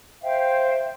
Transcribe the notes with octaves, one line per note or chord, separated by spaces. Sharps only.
C5 E5 F5 G5